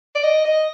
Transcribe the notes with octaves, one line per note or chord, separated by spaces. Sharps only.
D5
D#5
D#5